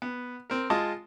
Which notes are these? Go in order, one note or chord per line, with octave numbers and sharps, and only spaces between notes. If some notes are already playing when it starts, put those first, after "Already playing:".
B3
C4 A#4
G#3 F4 D#5 A5